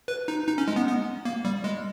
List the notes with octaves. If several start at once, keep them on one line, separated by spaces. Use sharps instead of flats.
B4
D#4
D#4
C#4
G#3
B3
B3
A#3
G3
G#3